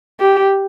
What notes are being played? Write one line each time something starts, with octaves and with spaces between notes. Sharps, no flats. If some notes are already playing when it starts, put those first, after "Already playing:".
G4